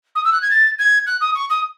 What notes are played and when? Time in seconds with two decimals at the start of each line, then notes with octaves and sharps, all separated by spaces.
0.15 D#6
0.25 E6
0.33 F#6
0.42 G#6
0.51 A6
0.79 G#6
1.07 F#6
1.21 D#6
1.35 C#6
1.50 D#6